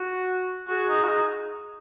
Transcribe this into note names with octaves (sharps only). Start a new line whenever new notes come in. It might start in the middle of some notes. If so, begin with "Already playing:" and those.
Already playing: F#4
F#4 G#4
D#4
F#4
D#4